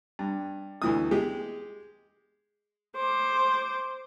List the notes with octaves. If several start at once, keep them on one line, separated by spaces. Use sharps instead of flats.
G2
D2 E3 D#6
G#3 G4
C5 D6